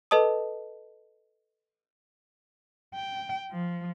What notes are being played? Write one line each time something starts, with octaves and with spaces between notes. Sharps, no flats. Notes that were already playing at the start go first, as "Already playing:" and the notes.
A4 B4 D#5 A5 D#6
G5
F3